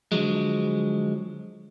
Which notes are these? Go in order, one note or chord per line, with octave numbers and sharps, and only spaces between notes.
D3 F3 F#3 G#3